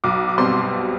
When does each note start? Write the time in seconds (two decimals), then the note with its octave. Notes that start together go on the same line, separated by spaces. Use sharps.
0.04 B1 D6
0.29 D6
0.38 B2 G3 C4 C6